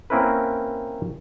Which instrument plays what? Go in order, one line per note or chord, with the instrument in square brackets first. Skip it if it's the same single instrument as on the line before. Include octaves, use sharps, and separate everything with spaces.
[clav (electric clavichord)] A#3 C4 C#4 E4 A#4 B4